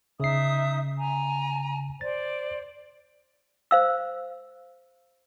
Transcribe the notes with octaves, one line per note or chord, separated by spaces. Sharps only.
C#3 D#4 E5 D#6 C7
G#5 A#5
C5 D5 A6
C5 F5 E6